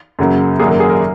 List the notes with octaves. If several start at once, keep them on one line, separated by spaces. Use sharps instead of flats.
F#2 C#3 F#3 A#3
G#1 F#2 F#3 A#3 G#4
A#4
G#4
A#4